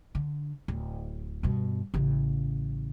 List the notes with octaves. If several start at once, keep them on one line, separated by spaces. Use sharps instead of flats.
D3
D1
G2 B2
A1 C#3